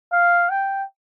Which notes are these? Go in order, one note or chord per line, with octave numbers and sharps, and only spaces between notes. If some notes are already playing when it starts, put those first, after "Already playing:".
F5
G5